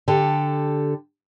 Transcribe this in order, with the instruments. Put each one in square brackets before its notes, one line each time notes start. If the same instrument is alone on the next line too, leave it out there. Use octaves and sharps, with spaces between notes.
[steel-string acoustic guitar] D3 G4 A4